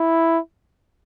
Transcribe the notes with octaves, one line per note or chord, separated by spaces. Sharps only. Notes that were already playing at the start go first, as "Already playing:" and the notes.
Already playing: E4